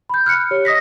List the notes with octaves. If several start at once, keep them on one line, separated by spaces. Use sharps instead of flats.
B5 G6
F6 F#6 C#7
G4 C#5
D#5 D#6 A#6 B6